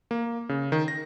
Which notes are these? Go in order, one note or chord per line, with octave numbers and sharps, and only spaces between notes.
A#3
C#3
D#3
A#6